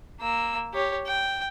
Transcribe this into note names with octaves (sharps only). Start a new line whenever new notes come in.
A#3 E6
G4 C#5
G5